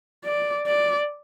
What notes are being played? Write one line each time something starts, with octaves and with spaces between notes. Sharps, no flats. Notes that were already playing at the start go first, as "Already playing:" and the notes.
D5
D5